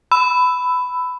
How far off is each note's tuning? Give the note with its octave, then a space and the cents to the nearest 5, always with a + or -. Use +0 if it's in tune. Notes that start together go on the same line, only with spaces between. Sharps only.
B5 +15 E6 +0